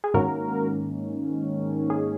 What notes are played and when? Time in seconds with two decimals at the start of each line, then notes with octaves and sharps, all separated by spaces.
0.04 G#4
0.14 G#2 D#3 A#3 C#4 F#4 A#4
1.90 G#4